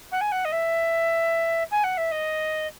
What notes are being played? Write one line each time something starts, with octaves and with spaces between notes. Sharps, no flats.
F#5
G#5
F#5
D#5
E5
G#5
F#5
E5
D#5